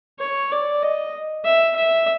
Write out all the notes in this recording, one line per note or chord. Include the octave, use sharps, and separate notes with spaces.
C#5
D5
D#5
E5
E5